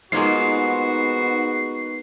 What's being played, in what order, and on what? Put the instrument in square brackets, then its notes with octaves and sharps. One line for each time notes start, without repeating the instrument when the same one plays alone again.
[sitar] G#2 [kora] G#3 A#3 F4 [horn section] B3 D#4 F#4 [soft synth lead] C7